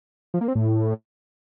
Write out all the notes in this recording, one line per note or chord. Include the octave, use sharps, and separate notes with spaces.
F3
A#3
C4
A2